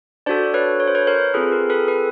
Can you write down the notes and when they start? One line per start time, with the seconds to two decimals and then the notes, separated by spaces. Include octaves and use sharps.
0.26 D4 F#4 A4 C5 D5
0.54 B4 C#5
0.80 C#5
0.88 C5
0.95 B4 C#5
1.07 A#4 C5
1.34 C4 F4 G#4 A4 B4
1.52 A#4
1.70 A4 B4
1.88 A4 B4